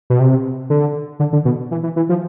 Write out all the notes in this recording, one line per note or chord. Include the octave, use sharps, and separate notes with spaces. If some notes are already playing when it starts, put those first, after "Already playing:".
B2
C3
D3
D3
D3
B2
E3
E3
E3
F3